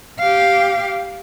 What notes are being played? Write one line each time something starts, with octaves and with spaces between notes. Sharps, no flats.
G4 F5